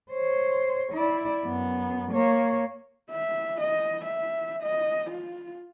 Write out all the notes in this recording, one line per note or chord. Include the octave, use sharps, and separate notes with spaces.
C5 C#5
E4 D5
F#2 B3
A#3 C#5
E5
D#5
E5
D#5
F4